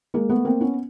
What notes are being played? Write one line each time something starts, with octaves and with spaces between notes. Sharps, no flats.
G#3 A#3
A3 B3
A#3 C4
B3 C#4